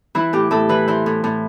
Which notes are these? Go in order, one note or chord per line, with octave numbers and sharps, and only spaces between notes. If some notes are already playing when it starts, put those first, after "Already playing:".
E3 E4
A2 G4
A2 A4
E3 B4
E3 C5
A2
A2